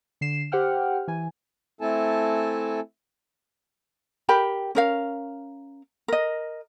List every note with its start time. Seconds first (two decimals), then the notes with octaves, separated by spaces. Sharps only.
0.21 D3 C7 E7
0.52 G4 C5 F#5 G5 F6
1.08 E3 G#5
1.81 A3 C4 E4 A4 G#5 A5
4.29 G4 A#4 G5 B5
4.75 C#4 A#4 F5
6.08 A#4 D#5